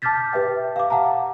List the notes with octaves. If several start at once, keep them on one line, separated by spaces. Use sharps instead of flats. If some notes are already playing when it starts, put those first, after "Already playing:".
A5 D6 F6 G6 A6 B6
G4 B4 E5 G5
F5 D6
F5 F#5 A5 A#5